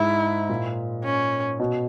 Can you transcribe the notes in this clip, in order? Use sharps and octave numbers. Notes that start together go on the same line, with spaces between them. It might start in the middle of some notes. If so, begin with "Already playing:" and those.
Already playing: G#2 E4
A#2
C#4
B2